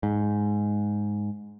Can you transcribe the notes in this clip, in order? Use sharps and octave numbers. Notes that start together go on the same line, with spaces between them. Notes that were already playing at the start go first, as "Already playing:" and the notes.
G#2